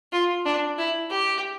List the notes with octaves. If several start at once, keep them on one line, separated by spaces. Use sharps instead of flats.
F4
D4
E4
G4